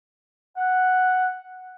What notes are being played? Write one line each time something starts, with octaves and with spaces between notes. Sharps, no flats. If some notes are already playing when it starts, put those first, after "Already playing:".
F#5